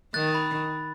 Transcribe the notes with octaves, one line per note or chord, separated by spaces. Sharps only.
D#3 F#6 A6
B5